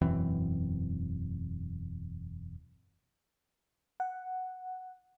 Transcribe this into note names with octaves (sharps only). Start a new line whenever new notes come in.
E1 F#2 E3 C4
F#5